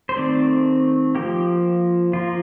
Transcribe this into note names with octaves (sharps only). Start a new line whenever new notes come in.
C5
D#3 A3 C4 D5
F3 A#3 G4
F3 A#3 F4